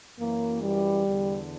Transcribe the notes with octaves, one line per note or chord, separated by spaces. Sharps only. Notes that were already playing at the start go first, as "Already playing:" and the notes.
F#2 E3 A#3
G3
E2 D3